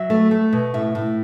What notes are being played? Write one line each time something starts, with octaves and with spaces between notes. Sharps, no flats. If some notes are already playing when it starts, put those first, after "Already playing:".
Already playing: F#3 E5
A3
A3
B2
A2 E5
A2